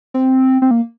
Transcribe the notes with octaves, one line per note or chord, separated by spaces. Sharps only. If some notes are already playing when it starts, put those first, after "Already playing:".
C4
C4
A#3